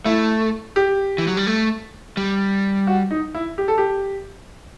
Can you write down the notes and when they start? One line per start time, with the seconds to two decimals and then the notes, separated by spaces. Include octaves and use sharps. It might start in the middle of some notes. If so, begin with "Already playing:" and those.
0.05 A3 E4
0.76 G4
1.18 E3
1.27 F#3
1.37 G3
1.47 A3
2.17 G3
2.87 F#4
3.11 D#4
3.35 E4
3.58 G4
3.68 A4
3.78 G4